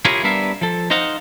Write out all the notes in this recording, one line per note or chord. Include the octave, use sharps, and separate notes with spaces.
E4 F4 G4 G#4 A#4 C#5
G3 B3 D4 A#4 E5 F5
F3 A4
D#4 C5 D#5 F5 F#5